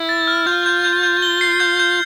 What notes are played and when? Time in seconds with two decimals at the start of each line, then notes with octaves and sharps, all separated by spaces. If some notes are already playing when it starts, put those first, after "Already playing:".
Already playing: E4
0.09 A6
0.27 F6
0.47 F4 G6
0.66 G6
0.85 G6
1.03 G6
1.22 G7
1.41 C7
1.60 G6
1.79 G6